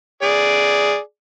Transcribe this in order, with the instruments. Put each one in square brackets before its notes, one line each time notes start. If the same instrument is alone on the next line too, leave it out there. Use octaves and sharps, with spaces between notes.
[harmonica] G#4 D5